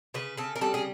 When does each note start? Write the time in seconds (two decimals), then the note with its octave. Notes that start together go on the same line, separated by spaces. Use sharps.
0.14 C#3 B4
0.37 C#3 A4
0.56 A#4
0.61 G3 A4
0.74 G#4